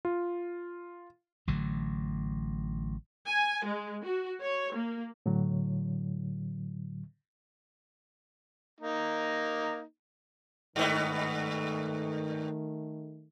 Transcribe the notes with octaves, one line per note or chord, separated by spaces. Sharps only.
F4
A1 D3 F#3 A3
G#5
G#3
F#4
C#5
A#3
A2 D3 F#3
A#3 D#4
G2 D#3 A3 B3